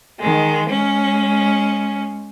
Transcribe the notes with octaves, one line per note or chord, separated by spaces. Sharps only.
D#3 G#3
G#3 C#4